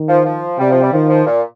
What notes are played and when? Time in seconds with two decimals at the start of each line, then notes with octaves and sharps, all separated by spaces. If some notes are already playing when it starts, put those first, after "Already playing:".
Already playing: D#3
0.08 F3
0.24 F3
0.59 C3 G3
0.70 F3
0.81 G3
0.92 D#3 F3
1.09 F3
1.25 A#2